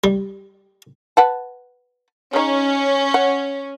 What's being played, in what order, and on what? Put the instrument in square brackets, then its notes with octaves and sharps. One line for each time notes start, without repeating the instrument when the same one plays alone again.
[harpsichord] G3
[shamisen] B4 F#5 A5
[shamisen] C#3 D#4 [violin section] C#4
[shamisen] F#5